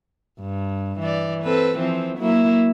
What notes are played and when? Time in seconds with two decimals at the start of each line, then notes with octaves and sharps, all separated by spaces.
0.41 G2
1.00 E3 D5
1.43 C4 A4 B4
1.78 E3 F3 C4
2.18 F#3 A#3 E4